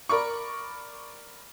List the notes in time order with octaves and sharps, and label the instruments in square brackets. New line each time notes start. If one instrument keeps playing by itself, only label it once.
[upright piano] A#4 D5 B5 C#6